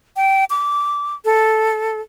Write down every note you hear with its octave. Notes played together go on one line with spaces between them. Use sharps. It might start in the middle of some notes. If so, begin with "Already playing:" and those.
G5
D6
A4